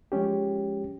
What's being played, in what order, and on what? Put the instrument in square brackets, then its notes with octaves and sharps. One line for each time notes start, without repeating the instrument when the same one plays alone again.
[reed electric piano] F3 G#3 C#4 G4